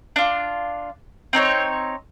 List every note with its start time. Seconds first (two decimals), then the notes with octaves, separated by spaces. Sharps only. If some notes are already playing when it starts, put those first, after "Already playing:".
0.16 D4 F4
1.33 C4 D#4 C#5